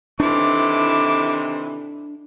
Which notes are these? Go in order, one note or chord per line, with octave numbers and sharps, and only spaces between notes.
C3 D#3 E3 D4 E4 A4 D6